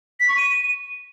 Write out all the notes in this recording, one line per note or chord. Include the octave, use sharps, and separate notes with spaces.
B6
C#6
D#7